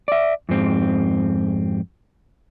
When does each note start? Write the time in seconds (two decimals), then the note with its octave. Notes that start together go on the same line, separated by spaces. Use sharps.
0.08 D5 E5
0.49 F2 G#2 C4